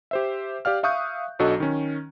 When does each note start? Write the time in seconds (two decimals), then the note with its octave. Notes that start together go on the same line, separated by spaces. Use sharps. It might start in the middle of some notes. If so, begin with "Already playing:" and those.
0.11 G4 C5 E5
0.65 G4 D5 F5 F6
0.83 E5 F5 C#6 D#6 F#6 G6
1.39 B1 F#3 D4 F#4 A4 D#5
1.60 D#3 C#4